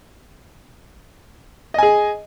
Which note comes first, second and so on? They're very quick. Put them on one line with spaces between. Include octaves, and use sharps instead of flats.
D#5 G#5 G#4